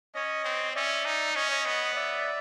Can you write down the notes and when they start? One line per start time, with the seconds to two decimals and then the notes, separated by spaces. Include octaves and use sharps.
0.15 C#4 C#5 D#5
0.45 C4
0.75 C#4 D5 E5
1.05 D#4
1.35 C#4 C#5 D#5
1.51 C#5 D#5
1.66 B3
1.95 D5 E5